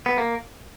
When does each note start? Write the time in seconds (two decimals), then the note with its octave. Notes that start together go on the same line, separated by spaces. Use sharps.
0.06 B3
0.18 A#3